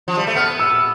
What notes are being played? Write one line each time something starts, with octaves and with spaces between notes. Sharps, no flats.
F3
G3
A3
B3 F6
E6